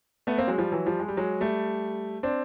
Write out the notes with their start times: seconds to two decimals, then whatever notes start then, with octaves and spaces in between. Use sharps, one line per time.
0.27 A3 B3
0.38 A#3 C4
0.48 F#3 G#3
0.58 F3 G3
0.72 E3 F#3
0.86 F3 G3
0.99 G#3
1.08 G3
1.17 F#3 G#3
1.41 G3 A3
2.23 C4 D4